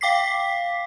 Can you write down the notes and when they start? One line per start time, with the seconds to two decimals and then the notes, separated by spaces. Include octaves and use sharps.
0.01 F5 G5 D6 B6 C7